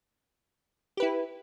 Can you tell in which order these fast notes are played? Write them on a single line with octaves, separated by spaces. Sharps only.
G4 B4 E4